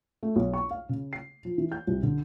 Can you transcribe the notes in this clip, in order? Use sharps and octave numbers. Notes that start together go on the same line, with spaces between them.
A3
B1
C#6
F5
C#3
C7
F3
E3
G6
C2
D3